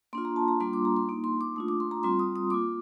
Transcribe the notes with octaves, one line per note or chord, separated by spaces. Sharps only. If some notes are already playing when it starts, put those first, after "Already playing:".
A#3 D4 F4 C6
A#5
A5
A#5
G3 A#3 D4 F4 C6
D6
A#5
C6
A#3 D#4
C6
D6
A3 D4 F4 D#6
D6
C6
A#5
G3 C4 F4 C6
D#6
D#6
A#3 F4 D6